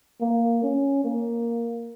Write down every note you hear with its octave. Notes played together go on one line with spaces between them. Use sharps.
A#3
C#4
A#3